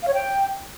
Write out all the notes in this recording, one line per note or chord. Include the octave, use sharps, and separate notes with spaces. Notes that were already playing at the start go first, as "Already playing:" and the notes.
F5
C#5
G5